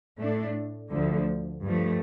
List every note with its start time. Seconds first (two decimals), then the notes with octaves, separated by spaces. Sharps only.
0.18 A2 A3 D4
0.90 D2 D3 F3
1.64 G2 F3 A3